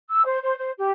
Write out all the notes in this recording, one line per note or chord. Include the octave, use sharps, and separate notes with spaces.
E6
C5
C5
C5
G4